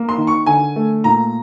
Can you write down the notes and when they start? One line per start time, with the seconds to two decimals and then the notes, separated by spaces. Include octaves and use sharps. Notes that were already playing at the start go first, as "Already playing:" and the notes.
Already playing: A#3
0.09 C6
0.18 D#3
0.27 C#6
0.46 D3 G#5
0.76 A3
1.04 A#2 A#5